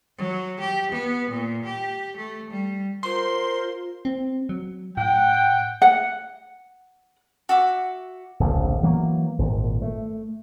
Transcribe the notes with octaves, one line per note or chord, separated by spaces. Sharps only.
F#3
G4
B3
A#2
G4
A3
G3
F4 A#4 C5 C6
C4
F#3
A2 F#5 G5
F#5
F#4 E5 D6
D1 A#1 F#2 C#3
E3 F#3 A#3 B3
G#1 A#2
A3